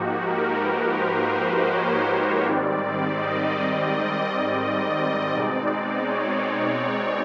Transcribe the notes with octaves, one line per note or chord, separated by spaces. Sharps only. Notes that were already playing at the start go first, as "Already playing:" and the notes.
Already playing: G#2 F3 A#3 D#4 F#4 G4
A#4
B4
C5
C#5
G#2 D#3 G3 C4 D5
D#5
D#5
B2 G#3 C4 D#4 D5
D5
C#5